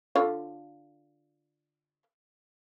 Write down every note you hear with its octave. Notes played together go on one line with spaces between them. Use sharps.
D3 F4 C#5